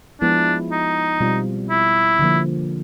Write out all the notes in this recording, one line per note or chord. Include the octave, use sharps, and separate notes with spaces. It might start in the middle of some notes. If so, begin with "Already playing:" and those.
F3 G#3 B3 D4 E4 G#4
D#4
B2 G3 C4 F4
E4
D3 F3 A#3